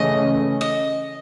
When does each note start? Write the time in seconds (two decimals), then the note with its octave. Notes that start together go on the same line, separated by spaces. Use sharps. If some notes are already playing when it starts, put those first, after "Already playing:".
Already playing: C#3 E3 A3 C#4 D#5
0.61 D#5